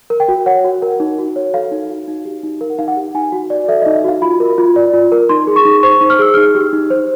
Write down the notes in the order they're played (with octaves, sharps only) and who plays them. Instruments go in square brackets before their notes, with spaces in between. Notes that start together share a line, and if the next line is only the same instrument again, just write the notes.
[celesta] A#4
G5
F#4
C#5 F#5
F#4
A#4
D#4
F#4
C#5
A4 F5
D#4
F#4
D#4
G4
D#4
A#4 F5
F#5
D#4 F5
F#5
G4
D#4 G#5
F#4
D5
A4 E5
D#5
D#4
E5
F#4 F5
F4 B5
A#4
F4
D5
F4
A#4
D#4 C6
G#4
C#6
D#4
C5 C#6
D#4
F6
G#4 E6
D#4 F6
G4
D#4
C5